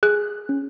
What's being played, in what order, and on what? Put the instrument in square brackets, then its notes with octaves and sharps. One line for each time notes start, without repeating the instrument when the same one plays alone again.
[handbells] G#4 F#6
C#4